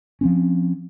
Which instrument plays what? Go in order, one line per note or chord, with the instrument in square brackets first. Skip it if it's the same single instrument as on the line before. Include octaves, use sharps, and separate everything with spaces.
[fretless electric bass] F3 C4 C#4